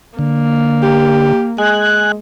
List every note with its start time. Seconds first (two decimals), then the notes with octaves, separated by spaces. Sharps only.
0.19 D3 A#3
0.83 G4
1.58 G#3 G#5 F#6